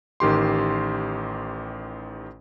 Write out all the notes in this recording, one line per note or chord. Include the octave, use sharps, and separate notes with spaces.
A1 D#3 G4 C6